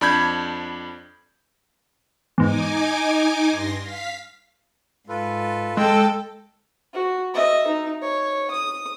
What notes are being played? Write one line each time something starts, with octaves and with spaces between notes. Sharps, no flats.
F2 D4 B5 G6 G#6
E2 G#2 D#4 G#5 D6
G2 C6 A#6
F5 B6
G#2 F4 A4 B4
G#3 A4 D#5 G5 E6
F#4
D#5 E5
D#4
C#5
D#6